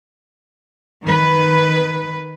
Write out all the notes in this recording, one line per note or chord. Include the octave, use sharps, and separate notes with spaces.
D#3 B4